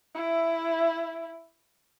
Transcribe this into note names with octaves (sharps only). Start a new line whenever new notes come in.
E4 E5